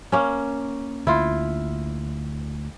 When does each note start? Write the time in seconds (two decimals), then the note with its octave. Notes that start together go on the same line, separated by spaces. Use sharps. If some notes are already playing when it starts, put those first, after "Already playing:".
0.12 A#3 C#4
1.07 D2 E4 F4